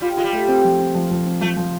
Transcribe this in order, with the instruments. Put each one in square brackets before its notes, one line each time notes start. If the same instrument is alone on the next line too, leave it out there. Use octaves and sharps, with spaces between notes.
[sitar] G3 [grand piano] F4
[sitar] G#3 [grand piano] F4
[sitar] G3
[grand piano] A3
C4
F3
C4
F3
F3
C4
[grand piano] F3 [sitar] A3
[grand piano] F3